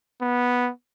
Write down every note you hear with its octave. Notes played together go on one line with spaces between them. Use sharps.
B3